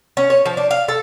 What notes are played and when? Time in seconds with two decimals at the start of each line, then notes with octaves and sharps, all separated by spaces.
0.17 C#4
0.30 C#5
0.45 F3
0.57 D4
0.71 F5
0.88 A4